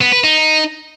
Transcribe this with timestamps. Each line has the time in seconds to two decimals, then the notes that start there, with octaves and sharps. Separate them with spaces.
0.01 B3
0.12 B4
0.24 D#4